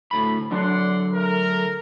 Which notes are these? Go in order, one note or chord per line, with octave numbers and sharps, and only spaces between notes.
D2 A2 B5
D3 F#3 D4 D5 F#5 C6
A3 A#4